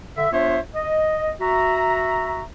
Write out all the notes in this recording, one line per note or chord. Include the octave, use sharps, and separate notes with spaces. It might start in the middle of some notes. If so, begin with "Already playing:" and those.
D3 E5
B3 D4 F4 C5 C#5 E5
D#5
F#4 E5 A#5